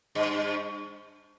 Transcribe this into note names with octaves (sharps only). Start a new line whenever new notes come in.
G2